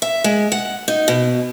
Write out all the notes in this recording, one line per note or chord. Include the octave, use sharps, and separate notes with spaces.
E5
G#3
F#5
D#4
B2